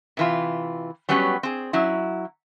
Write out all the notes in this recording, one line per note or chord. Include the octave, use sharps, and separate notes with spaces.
C3 E3 F4
F#3 G3 B3 C#4 G4
C4 G#4
F#3 C#4 E4